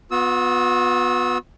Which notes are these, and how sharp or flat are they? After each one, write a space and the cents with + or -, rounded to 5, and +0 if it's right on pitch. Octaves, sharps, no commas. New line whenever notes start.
B3 +0 F#4 -45 E6 -25